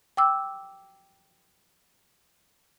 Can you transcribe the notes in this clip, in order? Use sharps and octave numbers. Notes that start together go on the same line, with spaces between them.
G5 D6 E6